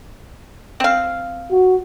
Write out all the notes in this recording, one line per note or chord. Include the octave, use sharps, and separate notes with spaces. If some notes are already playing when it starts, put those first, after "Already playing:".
C4 F5
F#4